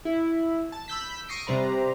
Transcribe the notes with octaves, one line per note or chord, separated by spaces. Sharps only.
E4
A5
B5 E6 G6 B6
C#6 D#6 A#6 C7 D7
C3 G3 B4 C5 D5 A#5